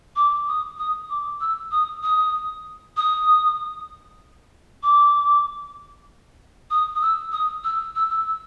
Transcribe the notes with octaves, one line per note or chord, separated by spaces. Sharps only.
D6
D#6
D#6
D6
E6
D#6
D#6
D#6
D6
D#6
D#6
E6
D#6
E6
E6
E6
E6